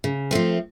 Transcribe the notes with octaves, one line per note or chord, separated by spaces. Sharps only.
C#3
F3 A3 C4